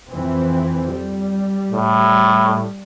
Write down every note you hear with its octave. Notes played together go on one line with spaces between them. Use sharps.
F2 E3 C4
G3
A2